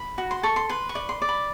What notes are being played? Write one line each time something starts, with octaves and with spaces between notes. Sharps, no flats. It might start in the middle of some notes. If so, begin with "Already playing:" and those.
Already playing: B5
F#4
C6
A4 C#6
C6
B4 C6
C#6
D5
C6
D5
B5